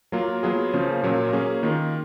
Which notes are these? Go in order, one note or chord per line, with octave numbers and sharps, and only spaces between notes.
F#3 A#3 F4 A#4
F#3 B3 F4 G#4
C#3 F3 A#3 C#4
A#2 F#3 C#4 F4 A#4
F#3 A#3 C#4 G#4
D#3 A#3 F4 A#4